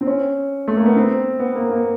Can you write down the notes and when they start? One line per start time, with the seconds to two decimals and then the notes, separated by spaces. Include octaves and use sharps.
0.01 C4
0.07 C#4
0.68 A3
0.77 A#3
0.86 B3
0.96 C4
1.39 B3
1.55 A#3
1.70 A#3